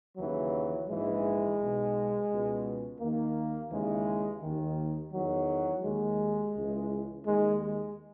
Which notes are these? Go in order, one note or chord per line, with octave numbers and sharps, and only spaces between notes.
D#2 C#3 E3 F#3
A#1 G#2 E3 G#3
B1 B2
C#2 B2
D#2 D#3 A#3
D#2 C#3 E3 G#3
D#2 D#3
E2 D#3 F#3
D#2 D#3 G#3
C#2 C#3 E3
D#2 D#3 G#3
G#3